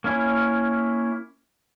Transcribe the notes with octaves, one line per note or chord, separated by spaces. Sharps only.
A#3 C#4 E4